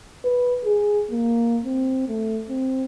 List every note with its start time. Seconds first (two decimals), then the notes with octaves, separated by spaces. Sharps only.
0.25 B4
0.65 G#4
1.11 A#3
1.65 C4
2.08 A3
2.49 C4